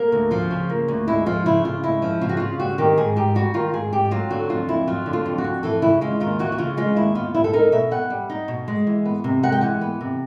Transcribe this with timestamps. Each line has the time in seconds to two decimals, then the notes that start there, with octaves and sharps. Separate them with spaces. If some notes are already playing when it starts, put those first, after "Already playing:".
Already playing: A#3 A#4
0.12 D2
0.31 F3 F4
0.51 C#3
0.70 A#3
0.88 D2
1.07 G#3 E4
1.26 F3 F4
1.46 C#3 E4
1.64 C#3 F4
1.83 G#3 E4
2.02 F3
2.21 C#3 F4
2.29 F#4
2.37 C#3 F4
2.59 G3 F#4
2.78 D#3 G4
2.98 G#2 G#4
3.16 G#2 G4
3.35 G3 F#4
3.54 D#3 F4
3.73 G#2 G#4
3.93 G#2 G4
4.11 F#3 F4
4.30 D3 F#4
4.49 F2 F4
4.68 F2 E4
4.88 F#3 F4
5.06 D3
5.13 F4
5.26 F2
5.38 F#4
5.44 F2
5.63 E3 A4
5.82 C#3 E4
6.01 G#3 F4
6.20 D#2 F4
6.39 E3 F#4
6.52 F#4
6.58 C#3 F4
6.77 G#3 F4
6.96 D#2 E4
7.15 B3 F4
7.34 G3 E4
7.44 A4
7.53 D#4 A#4
7.72 B2 E5
7.91 B3 F#5
8.10 G3
8.30 D#4
8.48 B2
8.68 G#3
8.87 E3
9.05 B3
9.24 C3
9.43 G#3 F#5
9.52 G5
9.61 E3 F#5
9.81 B3
10.01 C3